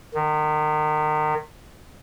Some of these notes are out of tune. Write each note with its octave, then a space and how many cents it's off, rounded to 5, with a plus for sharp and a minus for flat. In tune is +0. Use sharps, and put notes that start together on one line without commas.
D#3 -30